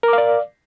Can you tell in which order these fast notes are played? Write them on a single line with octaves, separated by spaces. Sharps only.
A#4 D6 F5 D5